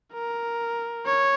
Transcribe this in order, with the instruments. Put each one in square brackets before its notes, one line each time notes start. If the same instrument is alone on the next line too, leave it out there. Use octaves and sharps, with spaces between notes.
[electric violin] A#4
C#5